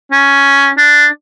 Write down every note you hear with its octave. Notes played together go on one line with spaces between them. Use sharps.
C#4
D4